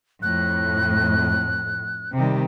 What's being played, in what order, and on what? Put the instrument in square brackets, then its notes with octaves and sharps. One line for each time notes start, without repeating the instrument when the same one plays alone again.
[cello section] F2 A2 [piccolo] F#6
[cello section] C3 D#3 G3